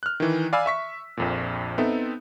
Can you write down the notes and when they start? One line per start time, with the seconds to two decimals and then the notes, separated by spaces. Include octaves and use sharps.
0.03 F6 F#6
0.20 D#3 E3
0.53 D5 F5 G#5 B5 E6
0.66 E5 C#6 B6
1.17 A#1 F2 A#2
1.78 B3 C4 D#4 A4 E5